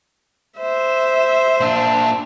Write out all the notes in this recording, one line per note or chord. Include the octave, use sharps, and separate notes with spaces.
C5 E5
A#2 D4